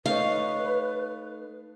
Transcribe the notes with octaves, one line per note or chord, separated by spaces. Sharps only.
A3 D#4 B4 C#5 F5